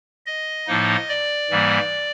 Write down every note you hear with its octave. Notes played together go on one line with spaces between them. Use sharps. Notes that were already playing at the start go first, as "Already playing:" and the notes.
D#5
A2 F3 A#3 D#4
D5
G#2 E3 G3 A#3